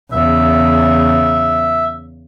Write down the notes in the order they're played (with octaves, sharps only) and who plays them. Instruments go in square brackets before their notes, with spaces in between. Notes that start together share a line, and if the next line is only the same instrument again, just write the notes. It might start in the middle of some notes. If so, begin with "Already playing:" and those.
[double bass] E2 C#3 [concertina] E5